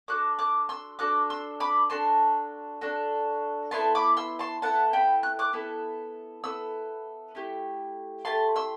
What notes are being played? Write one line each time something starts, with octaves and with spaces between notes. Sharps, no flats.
D4 F#4 A4 D6 F#6
D6 F#6
C6 E6
D4 F#4 A4 D6 F#6
C6 E6
B5 D6
D4 F#4 A4 A5 C6
D4 F#4 A4
B3 E4 A4 A5 C6
B5 D6
C6 E6
A5 C6
B3 E4 A4 F#5 A5
G5 B5
F#6
D6 F#6
B3 E4 A4
B3 E4 A4 E6
A3 E4 G4
A3 E4 G4 A5 C6
C6 E6